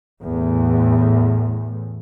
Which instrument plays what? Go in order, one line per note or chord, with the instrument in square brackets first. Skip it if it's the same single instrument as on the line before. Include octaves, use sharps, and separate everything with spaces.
[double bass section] E2 A2